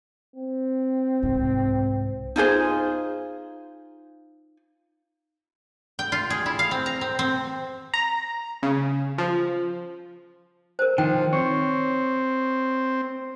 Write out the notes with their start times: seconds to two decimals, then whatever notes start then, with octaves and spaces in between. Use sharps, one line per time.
0.36 C4
1.23 C2 G#2
2.36 D#4 F4 G#4 C5
5.99 G5
6.12 F4
6.30 G#4
6.46 E4
6.59 F5
6.71 C4
6.86 A#5
7.01 C4
7.19 C4
7.94 A#5
8.63 C#3
9.18 F3
10.79 A#4 C5
10.98 D#3 F3 G5
11.33 C4 C#5